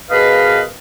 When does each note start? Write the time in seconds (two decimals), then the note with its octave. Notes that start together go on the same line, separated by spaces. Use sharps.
0.10 B2 G#4 A#4 B4 D#5 F5